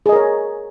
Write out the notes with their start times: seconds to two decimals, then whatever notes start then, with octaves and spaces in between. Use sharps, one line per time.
0.06 G#4
0.09 D#5
0.12 A#4
0.16 C#5